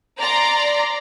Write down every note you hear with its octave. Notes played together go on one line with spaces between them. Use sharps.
D5 A#5 C6